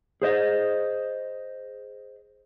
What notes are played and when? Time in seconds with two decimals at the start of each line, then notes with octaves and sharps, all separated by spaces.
0.22 G#4 C5 D#5